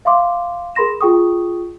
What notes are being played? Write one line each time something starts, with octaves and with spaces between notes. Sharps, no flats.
E5 F5 C6 D6
G#4 A#4 B5 C6 A#6 E7
F4 G#4 G5 C#6 D#6